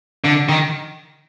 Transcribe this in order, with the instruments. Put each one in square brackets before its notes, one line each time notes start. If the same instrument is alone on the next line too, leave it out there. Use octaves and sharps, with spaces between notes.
[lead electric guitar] D3
D#3